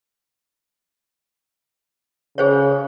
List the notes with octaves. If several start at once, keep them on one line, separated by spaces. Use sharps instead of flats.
C#3 G#4 C5 C#5